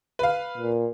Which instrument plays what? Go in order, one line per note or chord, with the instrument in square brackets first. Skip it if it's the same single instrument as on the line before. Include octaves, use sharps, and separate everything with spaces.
[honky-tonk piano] B4 F5
[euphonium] A#2